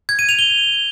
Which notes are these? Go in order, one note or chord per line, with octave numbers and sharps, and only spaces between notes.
G#6
D#7
F7
G7